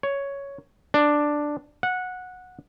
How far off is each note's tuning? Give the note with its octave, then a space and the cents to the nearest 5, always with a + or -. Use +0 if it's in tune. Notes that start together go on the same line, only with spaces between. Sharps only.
C#5 +5
D4 +5
F#5 -15